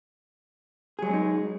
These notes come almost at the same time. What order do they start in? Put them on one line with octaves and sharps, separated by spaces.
G#4 F#3 G#3 C#4 D#4